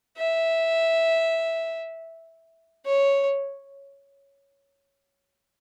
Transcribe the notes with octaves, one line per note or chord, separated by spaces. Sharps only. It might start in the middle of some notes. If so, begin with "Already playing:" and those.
E5
C#5